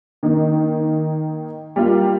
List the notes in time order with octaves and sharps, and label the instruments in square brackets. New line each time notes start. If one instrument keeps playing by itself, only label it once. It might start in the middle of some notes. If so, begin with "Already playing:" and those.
[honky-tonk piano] D#3 A#3 D#4
G3 A#3 F4